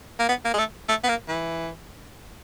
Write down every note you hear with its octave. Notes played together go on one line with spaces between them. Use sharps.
A#3
B3
A#3
G#3
A3
A3
B3
A#3
E3